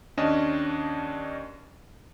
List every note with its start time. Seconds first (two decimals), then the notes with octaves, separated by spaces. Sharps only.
0.17 D#2 C#4 D4 D#5